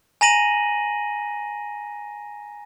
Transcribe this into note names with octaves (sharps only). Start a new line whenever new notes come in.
G#5 A#5 A#6 D#7 F#7